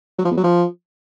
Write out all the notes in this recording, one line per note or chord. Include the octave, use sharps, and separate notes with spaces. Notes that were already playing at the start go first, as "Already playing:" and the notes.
F#3
F3
E2
F#3
F3